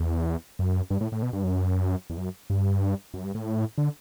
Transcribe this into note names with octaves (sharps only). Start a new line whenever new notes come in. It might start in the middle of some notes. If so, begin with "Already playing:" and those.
Already playing: E2
F#2
G2
A2
A2
B2
G2
F#2
E2
F#2
G2
F#2
G2
A2
D3